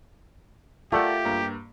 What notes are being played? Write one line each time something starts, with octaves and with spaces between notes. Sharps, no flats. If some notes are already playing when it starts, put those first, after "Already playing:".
A3 F4 G4 A4 A#4 D5 F#5
G2 A#3 A#5